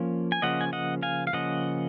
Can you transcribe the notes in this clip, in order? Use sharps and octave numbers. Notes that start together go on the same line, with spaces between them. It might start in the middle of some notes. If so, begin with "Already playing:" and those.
Already playing: F3 A#3 C#4
G#5
C#3 F3 A#3 C#4 D#5 F#5
G#5
D#5 F#5
F5 G#5
F5
C#3 F3 A#3 C#4 D#5 F#5